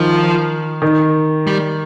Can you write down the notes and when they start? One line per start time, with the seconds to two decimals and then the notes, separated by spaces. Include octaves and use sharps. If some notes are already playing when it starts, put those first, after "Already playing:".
Already playing: D#3 F3
0.82 D#3
1.47 G3